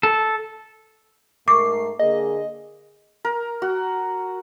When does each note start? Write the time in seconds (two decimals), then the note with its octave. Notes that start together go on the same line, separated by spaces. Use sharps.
0.03 A4
1.48 G#2 A3 A#4 C#6 D6 C7
1.99 D3 A#3 G#4 D#5
3.25 A#4
3.62 F#4